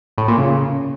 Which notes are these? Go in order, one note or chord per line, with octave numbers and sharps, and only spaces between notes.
A2
A#2
C#3